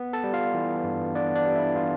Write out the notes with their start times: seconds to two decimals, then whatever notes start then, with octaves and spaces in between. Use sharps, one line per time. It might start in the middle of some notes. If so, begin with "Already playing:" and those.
Already playing: B3
0.13 A4 A5
0.24 G3
0.33 F4 F5
0.54 E3
0.84 G2
1.15 B3 D4 D5
1.35 D4 D5
1.46 G3
1.55 E4 E5
1.75 E3 F4 F5